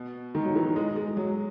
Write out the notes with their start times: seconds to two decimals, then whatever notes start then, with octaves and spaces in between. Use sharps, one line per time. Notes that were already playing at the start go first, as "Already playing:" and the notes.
Already playing: B2
0.35 D#3
0.45 F#3
0.56 E3
0.76 G#3
0.96 G#3
1.17 F#3